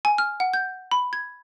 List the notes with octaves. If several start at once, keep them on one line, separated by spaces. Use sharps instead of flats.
G#5
F6
F#5
G6
B5
G#6